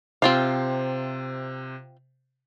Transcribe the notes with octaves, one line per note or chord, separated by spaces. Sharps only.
C3 C4 F4 C5 F5